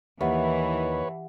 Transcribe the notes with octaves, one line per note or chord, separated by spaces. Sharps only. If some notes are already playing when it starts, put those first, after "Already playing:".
D#2 E3 G4 B4 C#5 E5 F#5